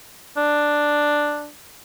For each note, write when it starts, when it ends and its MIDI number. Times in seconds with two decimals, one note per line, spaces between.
0.37 1.50 62